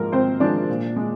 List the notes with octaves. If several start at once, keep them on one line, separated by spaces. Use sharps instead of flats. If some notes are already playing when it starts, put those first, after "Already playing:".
Already playing: G#2 F3 G#3 A#3 A#4
G#2 C4 C5
F3 G#3 D4 D5
A#2
G#3